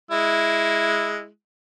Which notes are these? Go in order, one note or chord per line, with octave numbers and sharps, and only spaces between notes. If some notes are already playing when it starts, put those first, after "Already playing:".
G#3 E4